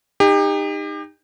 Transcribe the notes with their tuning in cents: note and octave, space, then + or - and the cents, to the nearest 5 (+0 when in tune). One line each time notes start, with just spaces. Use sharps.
D#4 -10 G4 +35